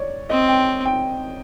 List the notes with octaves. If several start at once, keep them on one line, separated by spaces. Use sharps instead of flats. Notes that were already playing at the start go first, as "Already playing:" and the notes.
Already playing: C#5 D5
C4 D#5
G5
G5